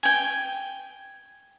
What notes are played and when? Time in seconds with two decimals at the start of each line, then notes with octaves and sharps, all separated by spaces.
0.03 G5 G#5